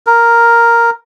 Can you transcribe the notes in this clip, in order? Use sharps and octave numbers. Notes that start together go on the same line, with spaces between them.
A#4